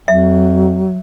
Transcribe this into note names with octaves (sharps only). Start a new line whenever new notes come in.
F2 F#3 E5